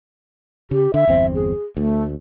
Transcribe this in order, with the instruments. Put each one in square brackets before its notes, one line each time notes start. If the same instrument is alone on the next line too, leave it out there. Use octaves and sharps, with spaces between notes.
[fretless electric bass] C#3 [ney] G4
[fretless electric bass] D3 [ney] E5
[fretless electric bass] G1 E2 C4
[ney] G#4
[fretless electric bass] D2 [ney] A3